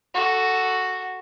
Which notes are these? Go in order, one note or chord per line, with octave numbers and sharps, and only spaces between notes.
F#4 A4